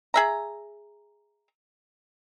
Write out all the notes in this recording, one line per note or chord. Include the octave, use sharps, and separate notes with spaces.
G#4 E5 A#5